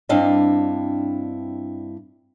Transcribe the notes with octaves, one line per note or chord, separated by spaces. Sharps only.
G2 C4 D4 E4 D#5 F5